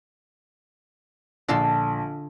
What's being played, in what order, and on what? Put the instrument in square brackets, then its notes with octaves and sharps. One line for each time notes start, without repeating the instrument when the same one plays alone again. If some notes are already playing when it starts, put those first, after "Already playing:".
[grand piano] A#1 [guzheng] D3 A4 C6